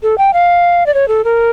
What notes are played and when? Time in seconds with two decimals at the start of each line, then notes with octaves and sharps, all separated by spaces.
0.03 A4
0.18 G5
0.34 F5
0.86 D5
0.94 C#5
1.08 A4
1.25 A#4